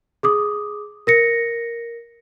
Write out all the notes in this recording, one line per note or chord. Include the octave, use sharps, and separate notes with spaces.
G#4 D6 D#6
A#4 A#6 C#7